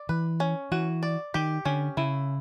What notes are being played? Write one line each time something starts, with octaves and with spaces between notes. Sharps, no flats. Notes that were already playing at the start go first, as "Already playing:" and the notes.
Already playing: D5
E3 B4
C#4
E3 F#4
D5
D#3 G4
D3 C#4
C#3 E4